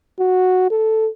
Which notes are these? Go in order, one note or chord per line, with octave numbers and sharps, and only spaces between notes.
F#4
A4